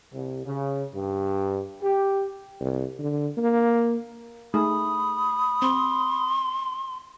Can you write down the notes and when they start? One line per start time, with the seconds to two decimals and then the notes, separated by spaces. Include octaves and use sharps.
0.13 C2
0.45 C#3
0.94 G2
1.82 G4
2.60 C2
2.99 D3
3.37 A#3
4.54 A3 D#4 G#4 B5 D#6
5.62 C4 C6